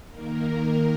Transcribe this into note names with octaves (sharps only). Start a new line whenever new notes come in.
D#3 A#3 A#4